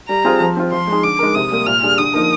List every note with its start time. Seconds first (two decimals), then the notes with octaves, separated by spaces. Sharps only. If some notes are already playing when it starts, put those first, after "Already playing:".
0.09 G3 A#5
0.24 C4 F4 G#4
0.40 F3
0.57 C4 F4
0.72 F3 C6
0.87 G#3 D#4 G#4
1.03 D3 D6
1.19 G#3 D#4 A#4
1.35 C3 D#6
1.51 G3 A#3
1.66 A#2 F6
1.83 G3 D4 G#4
1.98 D3 D#6
2.14 F3 A#3 D#4 A#4